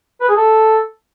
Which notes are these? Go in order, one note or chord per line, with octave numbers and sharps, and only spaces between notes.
B4
G#4
A4